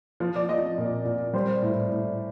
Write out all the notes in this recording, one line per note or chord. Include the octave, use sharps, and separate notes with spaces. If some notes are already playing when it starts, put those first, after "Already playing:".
F3
D5
F3 D#5
A#2
A#2
G3 C5
A2
A2